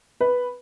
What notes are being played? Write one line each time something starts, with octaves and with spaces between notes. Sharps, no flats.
B4